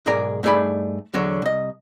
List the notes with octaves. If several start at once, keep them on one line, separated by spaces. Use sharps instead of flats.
B1 G#2 G#4 A#4 D5 A#5
G2 A3 D#4 G#4 D5 B5
E2 D3 F#3 C#5
C2 D#5